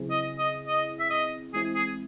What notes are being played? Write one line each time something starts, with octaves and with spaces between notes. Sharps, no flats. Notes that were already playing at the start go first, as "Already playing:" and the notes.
Already playing: C#3 F#3 C4 E4 G#4
D#5
D#5
D#5
E5
D#5
E3 G#3 C4 E4 G#4
G#4